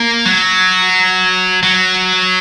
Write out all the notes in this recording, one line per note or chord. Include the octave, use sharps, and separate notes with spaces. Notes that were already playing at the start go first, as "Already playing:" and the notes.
Already playing: A#3
F#3
F#3